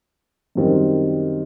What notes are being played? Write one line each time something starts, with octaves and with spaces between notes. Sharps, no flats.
F#2 D#3 G3 C4